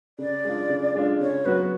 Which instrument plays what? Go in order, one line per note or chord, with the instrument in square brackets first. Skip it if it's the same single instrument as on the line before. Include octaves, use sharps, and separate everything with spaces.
[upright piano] C#3 [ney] D5
[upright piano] G#3 D4 F4
C#3
G#3 D4 F4
[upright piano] C#3 [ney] C#5
[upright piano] F#3 B3 F#4 [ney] B4